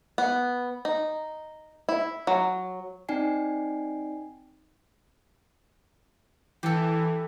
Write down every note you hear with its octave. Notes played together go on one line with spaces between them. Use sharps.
B3
D#4
E4
F#3
C4 D#4 D5 G5 G#5 C7
E3 G4 A4